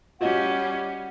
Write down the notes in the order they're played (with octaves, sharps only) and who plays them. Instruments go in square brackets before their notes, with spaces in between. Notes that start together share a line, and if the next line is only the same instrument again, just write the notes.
[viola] G3 C#4 [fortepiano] F4 F#4 D#5 [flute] F#5